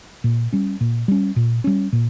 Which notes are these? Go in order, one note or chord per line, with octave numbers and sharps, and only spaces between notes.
A#2
G3 C#4
A#2
G3 C#4
A#2
G3 C#4
A#2